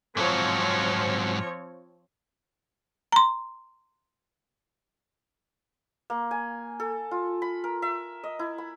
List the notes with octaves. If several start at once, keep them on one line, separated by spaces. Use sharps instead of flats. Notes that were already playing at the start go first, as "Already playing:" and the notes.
G#2 F3 F#3 C4 C#5
A#5 C6
A#3
G#5
A4
F4
B5
A#4
E5
D#5
E4
B5